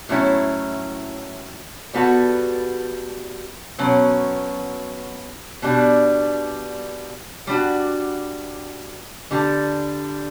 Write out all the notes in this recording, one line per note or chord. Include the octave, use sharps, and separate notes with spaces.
A2 F#3 C#4 E4
G3 B3 F#4 A4
B2 F#3 C#4
B2 G3 D4
G3 D4 F#4
D3 G3 D4